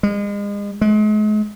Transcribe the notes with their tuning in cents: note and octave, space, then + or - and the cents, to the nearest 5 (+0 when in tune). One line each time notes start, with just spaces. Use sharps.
G#3 -35
G#3 +40